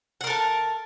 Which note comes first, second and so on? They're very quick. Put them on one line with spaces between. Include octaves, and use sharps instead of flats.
F#5 A#4 A4 A5